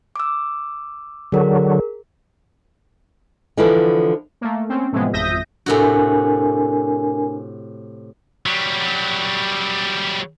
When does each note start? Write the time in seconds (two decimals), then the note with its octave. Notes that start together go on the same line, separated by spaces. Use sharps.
0.16 D6 E6
1.32 D3 F#3 G#4 A#4
3.57 D3 E3 F3 E4 A4 B4
4.41 A3 A#3
4.69 C4 C#4
4.92 A2 C3 E3 F3 G#3 B3
5.13 G#1 F2 E5 D#6 G6 A#6
5.66 A2 C3 D4 F#4 A#4 G#5
8.46 F#3 G3